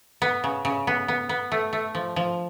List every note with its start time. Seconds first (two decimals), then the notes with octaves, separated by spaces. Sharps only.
0.22 B3
0.44 C#3
0.65 C#3
0.87 B3
1.08 B3
1.29 B3
1.52 A3
1.73 A3
1.95 F3
2.16 F3